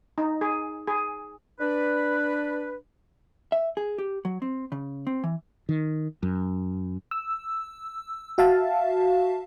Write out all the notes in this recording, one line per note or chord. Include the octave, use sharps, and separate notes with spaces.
D#4
G#4
G#4
D4 B4
E5
G#4
G4
F#3
C4
C#3
C4
E3
D#3
F#2
E6
F#4 E5 F5 A5